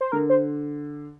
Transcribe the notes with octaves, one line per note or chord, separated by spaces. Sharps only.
C5
D3 A#4
C5